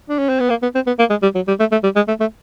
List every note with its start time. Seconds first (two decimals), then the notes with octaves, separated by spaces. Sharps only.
0.09 D4
0.19 C#4
0.29 C4
0.40 B3
0.50 A#3
0.62 B3
0.75 C4
0.87 B3
0.99 A#3
1.10 G#3
1.23 G3
1.35 F#3
1.48 G3
1.60 A3
1.72 A3
1.84 G3
1.96 G#3
2.08 A3
2.20 A3